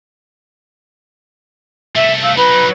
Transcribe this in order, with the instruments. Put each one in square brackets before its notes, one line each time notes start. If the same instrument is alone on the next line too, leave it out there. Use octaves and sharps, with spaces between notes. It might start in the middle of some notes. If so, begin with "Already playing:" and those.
[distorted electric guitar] C2 A3 [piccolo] E5
[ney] F5 [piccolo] E6
[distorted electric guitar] F#3 D#4 [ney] B4 [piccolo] B5